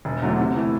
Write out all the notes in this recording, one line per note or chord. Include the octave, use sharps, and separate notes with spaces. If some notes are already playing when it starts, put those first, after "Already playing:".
E1
E2 D3 F#3 A3
C3
E3 A3 E4